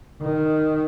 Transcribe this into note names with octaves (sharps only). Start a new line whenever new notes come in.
D#3